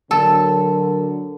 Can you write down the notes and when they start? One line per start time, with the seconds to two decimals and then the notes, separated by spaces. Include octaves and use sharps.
0.11 D3 F#3 A4 A#4